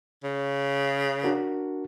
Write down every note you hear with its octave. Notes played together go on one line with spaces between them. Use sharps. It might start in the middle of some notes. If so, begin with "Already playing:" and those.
C#3
D4 F#4 A#4